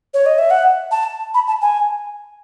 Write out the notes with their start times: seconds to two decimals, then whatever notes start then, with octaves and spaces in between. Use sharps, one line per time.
0.14 C#5
0.26 D#5
0.39 E5
0.51 F#5
0.91 A5
1.34 B5
1.47 A5
1.62 G#5